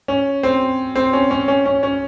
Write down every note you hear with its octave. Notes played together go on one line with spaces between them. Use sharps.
C#4
C4
C4
C#4
C#4
C#4
C#4
C#4